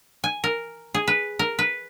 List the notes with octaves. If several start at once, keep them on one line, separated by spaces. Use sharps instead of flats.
G#5
A#4
G#4
B4
A#4
B4